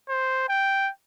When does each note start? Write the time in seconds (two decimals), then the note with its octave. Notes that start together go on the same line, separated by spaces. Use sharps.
0.09 C5
0.49 G5